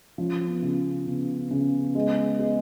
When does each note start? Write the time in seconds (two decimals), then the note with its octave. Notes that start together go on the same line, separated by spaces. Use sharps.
0.18 F3 C#4
0.48 B3
0.62 C#3
1.06 C#3 B3
1.51 C#3
1.95 G#3
2.39 G#3